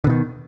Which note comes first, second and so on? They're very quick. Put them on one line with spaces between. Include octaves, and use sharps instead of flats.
D3 B2 D#3